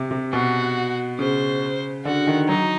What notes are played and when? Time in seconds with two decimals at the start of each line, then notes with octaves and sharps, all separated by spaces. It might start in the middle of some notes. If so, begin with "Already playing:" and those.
Already playing: C3
0.11 C3
0.33 B2 F#4
1.19 C#3 C5
2.05 D3 F#4
2.27 D#3
2.48 F#3 D#4